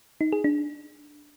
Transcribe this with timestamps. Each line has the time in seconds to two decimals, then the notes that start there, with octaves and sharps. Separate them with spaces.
0.21 D#4
0.32 G#4
0.44 D4